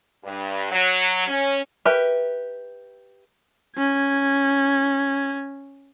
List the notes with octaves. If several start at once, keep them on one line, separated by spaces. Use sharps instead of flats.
G2
F#3
C#4
G4 A#4 B4 E5
C#4 G#6